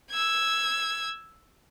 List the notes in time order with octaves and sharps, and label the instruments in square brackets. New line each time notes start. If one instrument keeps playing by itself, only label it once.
[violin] E6 G#6